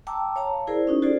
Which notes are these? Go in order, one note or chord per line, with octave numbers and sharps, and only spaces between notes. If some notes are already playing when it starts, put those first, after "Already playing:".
G5 A5 A#5 D6 E6
C#5 F5 A5 A#5
E4 G#4 A#4 C5 D5
C#4 D#4 F#4
F4 F#4 G#4 A4 C5 D5